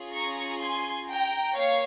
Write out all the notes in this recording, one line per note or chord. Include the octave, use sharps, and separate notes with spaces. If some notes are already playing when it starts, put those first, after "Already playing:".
Already playing: C#4 F4 G#4
A#5 C#6
G#5 C6
G5 A#5
A#3 C#5 F5